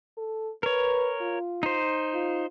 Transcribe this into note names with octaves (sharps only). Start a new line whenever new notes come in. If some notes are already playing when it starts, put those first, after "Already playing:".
A4
A#4 B4 C#5
F4
D#4 C5
F4